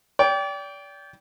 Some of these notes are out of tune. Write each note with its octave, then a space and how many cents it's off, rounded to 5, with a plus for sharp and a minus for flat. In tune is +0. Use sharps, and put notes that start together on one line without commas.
D5 -35 G5 +0